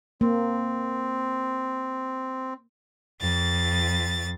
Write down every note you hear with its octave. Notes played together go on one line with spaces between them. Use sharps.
A#3 C4
F2 A6